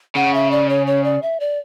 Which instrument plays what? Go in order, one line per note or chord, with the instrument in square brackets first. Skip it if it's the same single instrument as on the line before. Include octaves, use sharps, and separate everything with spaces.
[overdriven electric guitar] C#3 [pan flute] F#5
[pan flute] E5
D5
C#5
C#5
D5
E5
D5